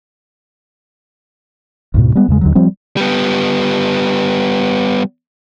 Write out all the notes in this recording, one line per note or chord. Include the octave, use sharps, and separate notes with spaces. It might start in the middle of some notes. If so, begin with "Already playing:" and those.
D2 G#2 B2
G3 G#3 B3
E2 C#3 G#3
D#2 D3 F#3
F3 G3 C4
G3 B3